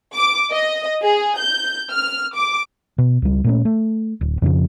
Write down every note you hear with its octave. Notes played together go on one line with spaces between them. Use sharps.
D6
D#5
G#4
G6
F6
D6
B2
C#2 G3
A#2 A3 C#4
A3
D1
F2 C#3 F3